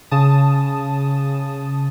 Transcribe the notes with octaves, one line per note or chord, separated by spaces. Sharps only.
C#3 A5 D#6